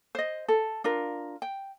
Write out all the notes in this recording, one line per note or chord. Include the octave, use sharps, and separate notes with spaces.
C5 D#5
A4
D4 F4 A#4
G5